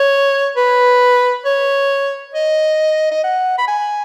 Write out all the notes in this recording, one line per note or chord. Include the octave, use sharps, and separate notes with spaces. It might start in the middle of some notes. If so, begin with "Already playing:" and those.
Already playing: C#5
B4
C#5
D#5
D#5
F#5
B5
G#5